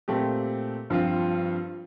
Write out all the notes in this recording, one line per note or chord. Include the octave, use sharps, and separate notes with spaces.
A#2 A3 C4 G4
G2 F3 C4 F4